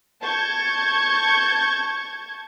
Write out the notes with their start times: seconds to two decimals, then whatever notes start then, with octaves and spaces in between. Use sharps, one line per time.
0.22 A5 C#6 G6 G#6